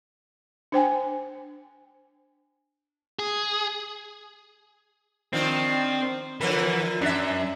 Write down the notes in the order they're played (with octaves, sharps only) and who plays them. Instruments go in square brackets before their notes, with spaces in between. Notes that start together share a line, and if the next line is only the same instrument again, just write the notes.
[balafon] D4 C5 G5 G#5
[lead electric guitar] G#4
[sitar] D#3 F3 D4 [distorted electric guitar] C4
[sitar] D3 F3 A#4 [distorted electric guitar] E3
[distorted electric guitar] F#2 [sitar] D4 E5